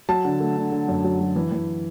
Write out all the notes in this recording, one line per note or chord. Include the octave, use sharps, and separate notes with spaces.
F#3 A5
D3
A3
D3
D3
F#2
F#3
F#3
E3
E3